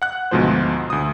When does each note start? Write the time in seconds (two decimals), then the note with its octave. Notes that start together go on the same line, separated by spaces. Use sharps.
0.02 F#5 F#6
0.31 D2 G#2 B2 F3 C5
0.90 D2 D#6